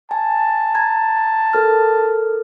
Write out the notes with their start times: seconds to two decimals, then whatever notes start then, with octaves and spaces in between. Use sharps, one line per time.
0.11 G#5 A5
0.75 A#5 G#6
1.53 A4 A#4 F6